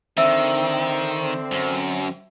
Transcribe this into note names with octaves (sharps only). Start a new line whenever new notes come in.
D3 D#3 C4 E5 E6
F#2